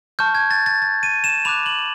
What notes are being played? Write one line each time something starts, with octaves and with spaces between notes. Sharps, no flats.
A5 C#6 F6 G6
G#6
A6
A6
A6
D#7
E7
B5 D6 F#6 F7
F#7